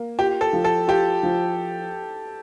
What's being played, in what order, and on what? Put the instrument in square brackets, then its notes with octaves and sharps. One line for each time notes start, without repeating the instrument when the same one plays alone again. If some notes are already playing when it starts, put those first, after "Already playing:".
Already playing: [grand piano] A#3
[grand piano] F4 [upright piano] G4
[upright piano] A4
[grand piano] F3
[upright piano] A4
[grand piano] F4 [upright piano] G4
[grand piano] F3